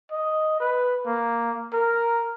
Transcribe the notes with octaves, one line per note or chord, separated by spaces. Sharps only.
D#5
B4
A#3
A#4